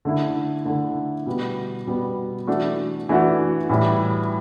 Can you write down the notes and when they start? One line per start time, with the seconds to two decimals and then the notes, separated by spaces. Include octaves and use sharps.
0.05 D3 A3 E4
0.65 D3 A3 E4
1.26 B2 G3 B3
1.87 B2 G3 B3
2.47 E3 A3 D4 F#4
3.09 E3 A3 D4 F#4
3.69 A2 E3 G3